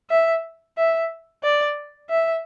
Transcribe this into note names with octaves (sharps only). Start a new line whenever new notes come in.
E5
E5
D5
E5